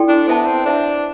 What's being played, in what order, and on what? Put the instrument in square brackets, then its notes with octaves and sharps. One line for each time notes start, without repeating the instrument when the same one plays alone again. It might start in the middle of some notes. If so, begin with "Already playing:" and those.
Already playing: [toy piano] E4 A4 D5 G5 C6
[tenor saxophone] D4
[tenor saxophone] B3 [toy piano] C5 E5 A5
[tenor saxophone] C4
[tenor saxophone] D4 [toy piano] C5 E5 A5